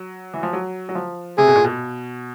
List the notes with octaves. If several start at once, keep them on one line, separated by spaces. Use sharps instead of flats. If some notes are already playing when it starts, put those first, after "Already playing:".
Already playing: F#3
E3
F3
F#3
F#3
F3
C3 G#4
B2
A#2
B2